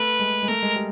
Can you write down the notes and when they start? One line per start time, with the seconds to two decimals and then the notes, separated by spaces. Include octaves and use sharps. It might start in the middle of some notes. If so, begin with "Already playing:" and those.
Already playing: A3 B4
0.20 G#3
0.43 G#3
0.48 A3 A#4
0.63 G#3
0.76 G3